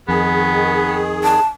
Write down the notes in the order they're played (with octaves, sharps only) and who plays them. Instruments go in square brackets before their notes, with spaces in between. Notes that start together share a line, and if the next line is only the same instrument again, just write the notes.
[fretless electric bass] F2 [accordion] D#3 G#4 [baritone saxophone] B3
[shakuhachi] A5